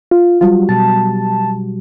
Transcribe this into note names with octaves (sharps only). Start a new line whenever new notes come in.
F4
F#3 G3 F4 F#4
B2 A5